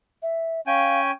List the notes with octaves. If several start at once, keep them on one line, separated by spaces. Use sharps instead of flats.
E5
C#4 F5 G5 G#5